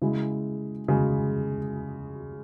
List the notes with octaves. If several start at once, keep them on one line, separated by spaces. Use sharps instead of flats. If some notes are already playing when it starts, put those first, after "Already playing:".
C#3 G#3 E4
C#3 G#3